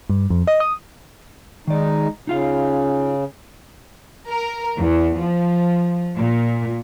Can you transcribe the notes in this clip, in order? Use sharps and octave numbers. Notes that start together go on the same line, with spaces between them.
G2
F2
D#5
D#6
D#3 G#3 D#4 D5
C#3 D#4 F4 F5
A#4
E2
F3
A#2